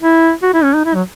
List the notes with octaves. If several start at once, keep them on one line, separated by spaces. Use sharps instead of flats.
E4
F#4
E4
C#4
D#4
E4
F#3